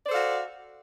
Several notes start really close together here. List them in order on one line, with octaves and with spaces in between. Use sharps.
D5 C5 A4 F5 F#4